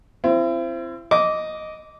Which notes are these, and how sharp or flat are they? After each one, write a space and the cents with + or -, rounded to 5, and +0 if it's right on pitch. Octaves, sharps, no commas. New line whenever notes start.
C4 +0 E4 +40
D#5 +0 D6 -15